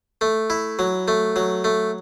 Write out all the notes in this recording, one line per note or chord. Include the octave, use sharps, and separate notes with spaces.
A3
E4
F#3
A3
F#3
A3